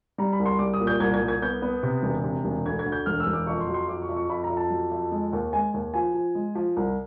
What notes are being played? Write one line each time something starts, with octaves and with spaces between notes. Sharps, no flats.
G3 A#5
B5
C2
C6
G3 D6
D#6
A#2
G6
C2 G#6
G#6
C2
G#6
B3 G6
B3
C3
E1
C3
E1
D2 G#6
G#6
D2
G6
E1 F6
E6
E1
D6
F2 C#6
C6
F#3
C6
F2 D6
C#6
F2
C#6
F2 B5
A#5
F2
A5
F#3
F2
G#3
D#2
G#3 G#5
D#2
F3 G#5
F3
G#3
F3
C2